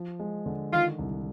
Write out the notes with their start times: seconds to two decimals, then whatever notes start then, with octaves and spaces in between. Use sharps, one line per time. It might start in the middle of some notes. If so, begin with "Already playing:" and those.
Already playing: F3
0.20 G#3
0.46 D3
0.72 D#3 F4
0.99 C2